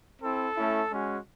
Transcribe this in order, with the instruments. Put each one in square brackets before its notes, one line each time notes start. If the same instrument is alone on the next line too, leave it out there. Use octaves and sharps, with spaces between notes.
[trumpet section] C4 E4 A4
A3 C#4 E4
G#3 C#4 F#4